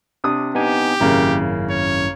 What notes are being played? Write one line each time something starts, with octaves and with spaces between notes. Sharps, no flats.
C3 D4 D#6
B3 D#4 G4 G#5
G#1 F#2 C#3 A#3 E4
C#5